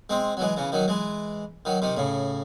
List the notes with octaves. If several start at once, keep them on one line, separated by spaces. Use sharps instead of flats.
G#3 C4
F#3
E3 G#3
C#3 E3
D#3 F#3
E3 G#3
D#3 F#3
C3 D#3
A2 C#3